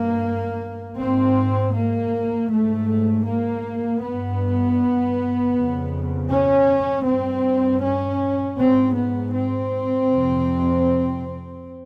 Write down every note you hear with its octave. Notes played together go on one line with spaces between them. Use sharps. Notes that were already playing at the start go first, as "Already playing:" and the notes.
Already playing: G2 A#3
G#2 C4
A#3
G#2 A3
A#3
G2 B3
F2 C#3
C#4
G2 C4
C#4
G#2 C4
B3
C4
F2 C3